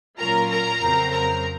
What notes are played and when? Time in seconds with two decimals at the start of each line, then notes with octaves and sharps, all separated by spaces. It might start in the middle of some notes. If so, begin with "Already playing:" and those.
0.18 A#2 F#3 C#4 F4 A#4 A#5
0.49 A#4 A#5
0.81 F2 C#3 F#3 C4
1.11 A#4 A#5